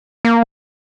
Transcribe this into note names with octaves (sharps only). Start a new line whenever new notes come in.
A#3